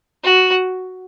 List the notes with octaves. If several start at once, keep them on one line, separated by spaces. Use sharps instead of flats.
F#4